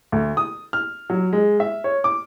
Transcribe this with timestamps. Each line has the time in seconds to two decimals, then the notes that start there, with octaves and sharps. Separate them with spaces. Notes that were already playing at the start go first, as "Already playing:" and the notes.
0.12 D2
0.37 D#6
0.73 F6
1.10 F#3
1.33 G#3
1.60 E5
1.84 C#5
2.04 D6